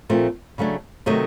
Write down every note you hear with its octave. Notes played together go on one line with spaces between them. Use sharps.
A#2 F3 A3 C4
C#3 F#3 A3 D4
C3 D#3 F#3 A3 C#5 D#5